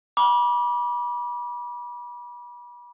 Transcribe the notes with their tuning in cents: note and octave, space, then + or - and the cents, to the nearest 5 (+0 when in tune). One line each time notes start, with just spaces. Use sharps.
B5 -35 D6 -10